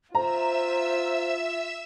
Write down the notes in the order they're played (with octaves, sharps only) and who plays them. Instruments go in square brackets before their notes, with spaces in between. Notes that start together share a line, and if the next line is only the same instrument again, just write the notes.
[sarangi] F4 [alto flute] C5 [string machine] E5 E6 [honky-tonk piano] A#5